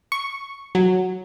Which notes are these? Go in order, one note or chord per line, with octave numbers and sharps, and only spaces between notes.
C#6
F#3